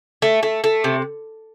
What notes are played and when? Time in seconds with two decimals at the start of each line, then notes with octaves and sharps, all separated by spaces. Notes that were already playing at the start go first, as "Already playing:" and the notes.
0.22 A3
0.43 A3
0.64 A3
0.84 C3